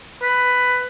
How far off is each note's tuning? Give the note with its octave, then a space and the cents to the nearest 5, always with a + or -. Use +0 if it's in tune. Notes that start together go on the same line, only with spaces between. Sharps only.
B4 +10